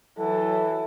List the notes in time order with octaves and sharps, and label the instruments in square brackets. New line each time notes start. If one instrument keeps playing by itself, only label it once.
[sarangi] E3 [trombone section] F#3 A4